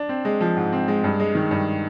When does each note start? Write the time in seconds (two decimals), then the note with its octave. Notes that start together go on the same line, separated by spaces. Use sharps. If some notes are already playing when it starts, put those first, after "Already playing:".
Already playing: D4
0.09 C4
0.25 G#3
0.41 F3
0.57 G#2
0.72 C4
0.88 G#3
1.04 G2
1.20 G#3
1.35 D#3
1.51 G2